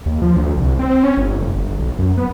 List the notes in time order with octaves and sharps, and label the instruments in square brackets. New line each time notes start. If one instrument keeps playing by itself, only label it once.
[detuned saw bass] D#2
F3
D2
C2
C4
C#4
G1
F1
G1
B1
F#2
B3